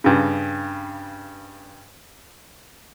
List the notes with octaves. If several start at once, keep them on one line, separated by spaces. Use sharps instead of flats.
G2 C#3